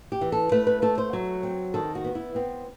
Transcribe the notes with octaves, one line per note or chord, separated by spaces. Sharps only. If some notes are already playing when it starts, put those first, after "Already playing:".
G4
E3
A4
A3 B4
B4
A3 A4
C5
F#3
C4
D#3 A4
F#4
B3
E4
B3 C4